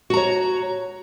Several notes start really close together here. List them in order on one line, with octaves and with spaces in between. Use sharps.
F#4 A#5 C#5